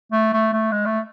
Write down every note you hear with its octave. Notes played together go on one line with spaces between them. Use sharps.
A3
A3
A3
G#3
A3